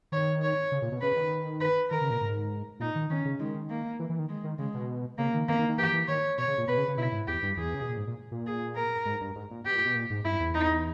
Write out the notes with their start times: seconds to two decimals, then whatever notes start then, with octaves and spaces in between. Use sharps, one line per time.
0.12 D#3 C#5
0.42 C#5
0.72 C#3
0.82 A#2
0.92 B2
1.01 C#3 B4
1.16 D#3
1.61 B4
1.90 D#3 A#4
2.01 C#3
2.10 A#2
2.21 G#2
2.80 A#2 D#4
2.95 D#3
3.10 D#3 C#4
3.25 C#3
3.39 D#3 G#3
3.70 A#3
3.99 E3
4.10 E3
4.19 D#3
4.29 G#3
4.44 D#3
4.58 C#3 G#3
4.74 B2
5.18 C#3 A#3
5.34 D#3
5.48 D#3 A#3
5.59 D#3
5.69 D#3
5.78 E3 G4
5.93 E3
6.07 D#3 C#5
6.38 B2 C#5
6.48 C#3
6.58 A#2
6.68 B2 B4
6.78 C#3
6.88 C#3
6.97 B2 E4
7.12 G#2
7.27 E2 G4
7.42 G2
7.57 E2 G#4
7.75 C#3
7.82 B2
7.90 A#2
7.97 G#2
8.07 A#2
8.31 A#2
8.47 G#4
8.76 A#4
9.05 G#2
9.21 G2
9.35 G#2
9.51 A#2
9.66 B2 G4
9.75 A#2
9.85 B2
9.95 A#2
10.10 G#2
10.25 G2 E4
10.40 E2
10.54 D#4